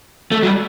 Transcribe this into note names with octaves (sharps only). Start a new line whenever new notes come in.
A3
F#3
G3